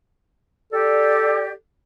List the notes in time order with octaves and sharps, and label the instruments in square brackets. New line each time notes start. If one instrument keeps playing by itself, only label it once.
[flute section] G4 D5 [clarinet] A4